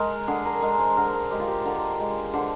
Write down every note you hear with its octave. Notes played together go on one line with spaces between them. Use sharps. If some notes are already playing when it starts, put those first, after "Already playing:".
Already playing: G#3 A#4
D3 G#4
A#4
G#3 A#4
C5
D3 A#4
A#4
G#3 G4
F4
G4
D3 A#4
G#3
D3 C5